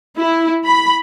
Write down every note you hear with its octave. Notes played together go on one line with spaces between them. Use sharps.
E4
B5